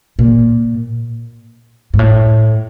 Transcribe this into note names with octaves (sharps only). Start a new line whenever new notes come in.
A#2
G#2
A2